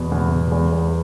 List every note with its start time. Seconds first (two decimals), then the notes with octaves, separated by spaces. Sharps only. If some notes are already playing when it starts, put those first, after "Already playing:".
Already playing: E2 B2
0.12 E2
0.32 B2
0.52 E2
0.72 E2